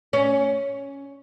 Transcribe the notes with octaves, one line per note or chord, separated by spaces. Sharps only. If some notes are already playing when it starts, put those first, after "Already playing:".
C#4